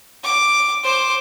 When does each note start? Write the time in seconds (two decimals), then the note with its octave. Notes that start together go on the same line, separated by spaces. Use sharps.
0.23 D6
0.83 C5 D6